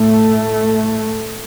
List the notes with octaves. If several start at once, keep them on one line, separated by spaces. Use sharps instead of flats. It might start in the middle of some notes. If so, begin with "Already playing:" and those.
Already playing: A2 A3
A2